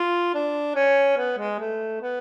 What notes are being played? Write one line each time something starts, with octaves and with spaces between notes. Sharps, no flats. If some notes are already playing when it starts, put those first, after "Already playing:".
Already playing: F4
D4
C#4
B3
G#3
A3
B3